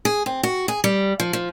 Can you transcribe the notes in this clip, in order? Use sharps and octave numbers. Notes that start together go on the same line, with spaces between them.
G#4
C4
F#4
G#4
G3
F3
F3